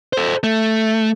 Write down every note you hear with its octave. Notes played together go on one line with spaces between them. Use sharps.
A4 C5
A3